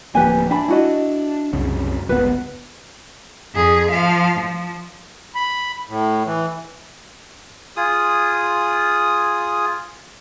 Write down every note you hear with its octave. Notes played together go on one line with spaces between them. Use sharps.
D1 F3 A#3 G4 B4 G#5
D4 E5 G#5 B5
E4 F#4 D#5
C2 F#2 C#3
G1 C#2 B3 B4
F2 G#4
F3 F5
F3
B5
A2
E3
F4 G#4 D#6